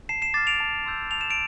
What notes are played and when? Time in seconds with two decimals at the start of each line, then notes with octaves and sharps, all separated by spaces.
0.09 A5 C7 E7
0.22 C7 E7
0.34 D6 F6 A6 C7
0.47 D7 F7
0.60 A5
0.86 C6 E6 G6
1.11 A5 F7
1.21 E7
1.30 D7 F7